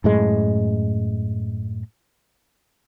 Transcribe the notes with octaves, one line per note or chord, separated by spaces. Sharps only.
F#2 A2 G#3